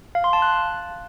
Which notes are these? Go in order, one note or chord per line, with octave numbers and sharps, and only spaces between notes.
F5
C6
A5
F#6